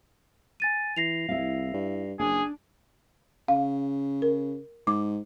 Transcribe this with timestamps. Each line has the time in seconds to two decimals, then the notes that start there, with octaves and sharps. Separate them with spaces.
0.60 G#5 A6 D#7
0.96 E3 A#6 C7 F7
1.29 C2 E4 F5
1.73 G2
2.19 F#1 D4 G#4
3.48 C#3 F5
4.22 A#4
4.87 G#2 D6